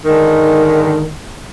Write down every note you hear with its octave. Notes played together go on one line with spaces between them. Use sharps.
G#2 D3 D#3